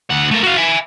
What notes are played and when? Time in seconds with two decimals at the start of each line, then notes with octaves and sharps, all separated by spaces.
0.10 D2 F#5
0.31 A3 A#4
0.43 F#4 F5
0.57 E5 G#5